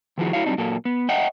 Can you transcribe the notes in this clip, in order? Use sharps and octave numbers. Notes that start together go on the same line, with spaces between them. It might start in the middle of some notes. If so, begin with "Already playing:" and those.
D#3 F3 E4 F#4 G#4 C5
A3 E4 F#4 C#5 F5
F#3 G3 C4 D4 D#4
A#2 F#3 A#3 A4
B3
C#5 D#5 E5 F#5 G5